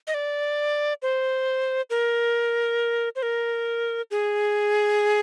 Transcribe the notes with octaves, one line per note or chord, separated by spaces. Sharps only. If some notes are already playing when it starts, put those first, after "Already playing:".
D#5
D5
C5
A#4
C5
A#4
G#4